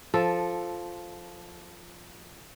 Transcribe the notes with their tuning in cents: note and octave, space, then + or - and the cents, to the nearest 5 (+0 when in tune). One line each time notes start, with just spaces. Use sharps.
F3 +0 A4 +0